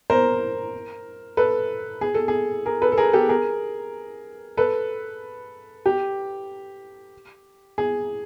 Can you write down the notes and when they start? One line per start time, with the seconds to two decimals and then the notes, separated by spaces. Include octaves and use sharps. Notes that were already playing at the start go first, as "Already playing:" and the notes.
0.10 A#4 C5
1.37 A4 B4
2.01 G#4
2.14 A4
2.28 G#4
2.66 G#4 A#4
2.82 A4 B4
2.92 A4
2.98 G#4 A#4
3.13 G4 A4
3.29 G#4 A#4
4.57 A4 B4
5.86 G4
7.78 G#4